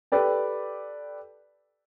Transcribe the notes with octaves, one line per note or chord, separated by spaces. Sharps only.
G4 A4 B4 D5 G5